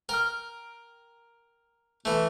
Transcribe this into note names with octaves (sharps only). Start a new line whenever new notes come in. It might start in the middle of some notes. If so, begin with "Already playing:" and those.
A#4 G5 F6
E3 A3